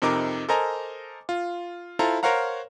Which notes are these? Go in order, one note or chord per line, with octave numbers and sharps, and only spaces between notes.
F2 C3 D#4 A#4 D6
A4 A#4 C5 D#5 G#5 A#5
F4
E4 F4 A4 C5 A#5
A#4 C5 C#5 F5 F#5 A#5